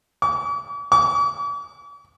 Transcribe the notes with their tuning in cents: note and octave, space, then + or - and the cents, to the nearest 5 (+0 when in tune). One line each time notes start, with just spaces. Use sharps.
D6 -45
D6 -45